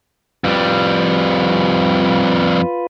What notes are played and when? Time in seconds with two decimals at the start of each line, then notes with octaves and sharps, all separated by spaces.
0.44 F2 G3 F4 B4